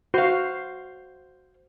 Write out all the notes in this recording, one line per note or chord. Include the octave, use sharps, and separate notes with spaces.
F#4 C5 F5